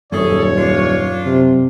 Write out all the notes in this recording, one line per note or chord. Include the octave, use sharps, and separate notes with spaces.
D#1 F#2 C#4 G#4 A4 C#5
D4 F4
C3